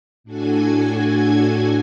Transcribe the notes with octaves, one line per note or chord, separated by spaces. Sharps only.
A2 D4 F#4 A4 G#5 G#6